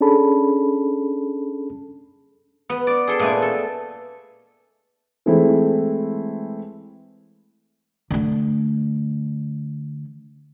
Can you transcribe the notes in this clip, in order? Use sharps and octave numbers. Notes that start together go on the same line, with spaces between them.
C#4 D4 G#4 A4 A5 B5
B3
D5
G#4 A4 G5
A#2 G#3 A3 B3 G#5
A4
E3 G#3 A3 C4 E4
D3 A3